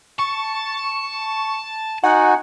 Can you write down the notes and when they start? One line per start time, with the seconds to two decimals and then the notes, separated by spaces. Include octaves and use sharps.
0.19 A5 C#6
2.04 D#4 F#4 F#5 G#5